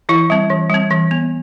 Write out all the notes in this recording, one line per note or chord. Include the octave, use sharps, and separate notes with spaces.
E3 E4
G3 C4
E3
G3 C4
E3
B3